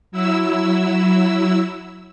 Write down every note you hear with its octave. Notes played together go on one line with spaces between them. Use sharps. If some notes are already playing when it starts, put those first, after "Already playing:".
F#3 E4 E6